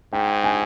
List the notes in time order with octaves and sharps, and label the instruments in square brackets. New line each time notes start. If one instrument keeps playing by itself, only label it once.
[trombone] G#2 [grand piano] G5
[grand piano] G#5